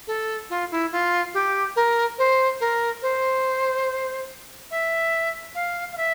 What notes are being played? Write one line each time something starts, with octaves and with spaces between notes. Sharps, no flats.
A4
F4
E4
F4
G4
A#4
C5
A#4
C5
E5
F5
F5
E5